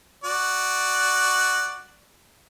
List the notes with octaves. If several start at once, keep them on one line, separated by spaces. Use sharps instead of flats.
F#4 D5